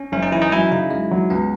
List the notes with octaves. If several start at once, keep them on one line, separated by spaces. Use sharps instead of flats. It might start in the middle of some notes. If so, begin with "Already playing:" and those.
Already playing: C#4
F#1 C#4
D#4
E3 E4
D#4
F#2 E4
C#3 D#4
F#2 G#3
F#3
C#2 B3